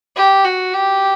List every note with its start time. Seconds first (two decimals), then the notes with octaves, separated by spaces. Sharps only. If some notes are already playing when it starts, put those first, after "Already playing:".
0.16 G4
0.45 F#4
0.74 G4